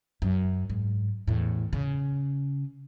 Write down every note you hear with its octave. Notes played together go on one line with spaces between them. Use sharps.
F#2
G#2
E2 A2
C#3